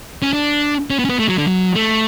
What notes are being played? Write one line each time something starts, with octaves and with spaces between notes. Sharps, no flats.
C#4
D4
C#4
B3
C#4
B3
A3
F#3
D3
F#3
A3